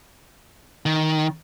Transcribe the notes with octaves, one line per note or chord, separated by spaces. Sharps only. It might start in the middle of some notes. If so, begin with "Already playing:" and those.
D#3